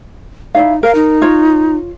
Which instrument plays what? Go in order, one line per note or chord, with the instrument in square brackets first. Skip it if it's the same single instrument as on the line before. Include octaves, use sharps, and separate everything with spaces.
[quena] D#4 [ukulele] E4 D5 F5
[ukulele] A#4 [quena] F5
[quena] D#4
[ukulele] F4 C#5